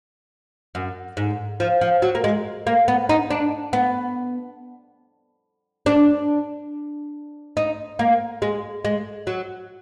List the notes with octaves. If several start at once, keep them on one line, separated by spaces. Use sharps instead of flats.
F#2
G#2
F3
F3
F#3
A#3
G#3
A#3
B3
D#4
D4
B3
D4
D#4
A#3
G#3
G#3
F#3